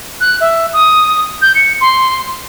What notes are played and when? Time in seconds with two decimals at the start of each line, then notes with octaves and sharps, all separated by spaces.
0.21 F#6
0.41 E5
0.73 D#6
1.42 G6
1.55 C#7
1.81 C6